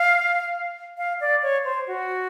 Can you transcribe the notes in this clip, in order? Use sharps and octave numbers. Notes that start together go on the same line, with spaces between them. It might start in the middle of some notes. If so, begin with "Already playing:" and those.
Already playing: F5
F5
D5
C#5
C5
F#4